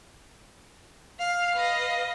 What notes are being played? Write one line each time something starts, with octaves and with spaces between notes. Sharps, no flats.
F5 F6 C7
B4 D#5